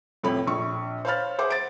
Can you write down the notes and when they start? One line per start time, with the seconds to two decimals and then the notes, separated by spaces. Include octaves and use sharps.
0.23 F1 F2 A2 A3 C#5 B5
0.47 A#1 C#6
1.05 C5 C#5 F5 B5 F6 A6
1.38 G#4 C5 E5 F#5 D6
1.50 A6 D7